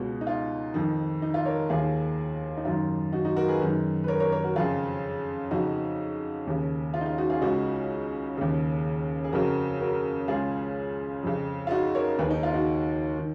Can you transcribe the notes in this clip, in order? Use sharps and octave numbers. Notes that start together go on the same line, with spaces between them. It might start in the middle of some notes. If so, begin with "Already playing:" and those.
Already playing: C#2 B2
D#4
F4
F2 D#3
D#4
F4
A#4 C#5
D#2 D#3 F4 G#4
D#4
F#2 D#3 F4
D#4 F#4
D#4 F#4
F#4 A#4
G#4 B4
F#2 D#3
B4
A#4 C#5
A#4 C#5
A#4 C#5
F#4 A#4
F2 C#3 F4 G#4
F2 C#3 D#4 F#4
D#2 C#3
F4
D#4
F4
D#4 F#4
F4 G#4
C#2 C#3 D#4 F#4
D#2 C#3
G#4
F2 C#3 F#4 A#4
F#4 A#4
C#2 C#3 F4 G#4
F2 C#3
F4
D#4 F#4
A#4 C#5
D#2 D#3 G#4 B4
D#4
F4
D#4 F#4
D#3